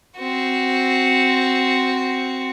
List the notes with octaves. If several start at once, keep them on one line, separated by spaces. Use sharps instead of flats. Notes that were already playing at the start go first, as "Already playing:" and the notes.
C4 F#4